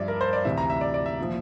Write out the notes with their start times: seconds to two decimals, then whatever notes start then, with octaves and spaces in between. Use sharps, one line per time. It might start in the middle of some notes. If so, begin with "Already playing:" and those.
Already playing: G2 F3 D5 E5
0.08 A#4
0.21 C5
0.33 D5
0.45 D2 C3 E3 E5
0.58 A#5
0.70 E5
0.81 D5
0.94 D5
1.06 E5
1.20 A#2 F3